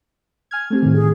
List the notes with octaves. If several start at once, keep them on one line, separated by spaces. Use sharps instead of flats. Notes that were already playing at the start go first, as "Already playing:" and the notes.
G#5 F6 G#6
A3 C4 G4
A2 D#3
G#4